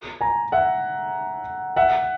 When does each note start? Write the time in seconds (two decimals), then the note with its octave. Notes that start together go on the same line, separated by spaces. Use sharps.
0.21 G#5 A#5
0.52 E5 F#5
1.76 E5 F#5